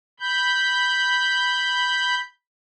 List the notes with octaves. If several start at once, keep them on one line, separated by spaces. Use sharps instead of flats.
B5 G6